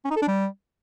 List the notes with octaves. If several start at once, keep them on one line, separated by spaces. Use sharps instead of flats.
C#4
D#4
A4
D4
G3